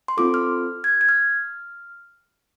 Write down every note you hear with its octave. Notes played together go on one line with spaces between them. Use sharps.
C6
C4 F4 A4 D6
F6
G#6
G#6
F6